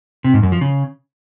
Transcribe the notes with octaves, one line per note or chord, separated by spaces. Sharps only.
C3
G#2
F#2
F3
C#3